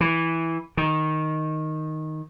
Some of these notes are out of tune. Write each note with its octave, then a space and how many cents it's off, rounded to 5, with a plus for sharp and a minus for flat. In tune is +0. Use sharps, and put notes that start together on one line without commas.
E3 -5
D#3 +0